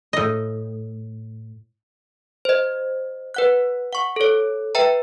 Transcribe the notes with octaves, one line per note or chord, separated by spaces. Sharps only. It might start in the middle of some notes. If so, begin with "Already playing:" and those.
A2 D#5
C5 D#5
B4 F#5 F#6
F#5 C#6
A4 C#5
B4 E5 G5 A#5